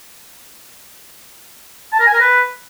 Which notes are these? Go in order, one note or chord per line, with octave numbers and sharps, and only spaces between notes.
A5
A#4
G#5
A#4
B4